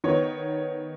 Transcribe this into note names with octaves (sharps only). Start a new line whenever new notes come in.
D#3 B3 D#4 C#5